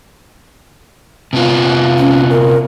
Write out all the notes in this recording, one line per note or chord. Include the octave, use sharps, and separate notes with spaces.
C3 B3 F4
C#4
A#4